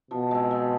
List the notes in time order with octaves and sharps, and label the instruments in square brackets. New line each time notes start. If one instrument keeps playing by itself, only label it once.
[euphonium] B2 [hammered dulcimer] F3
[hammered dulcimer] G#3 C4
F3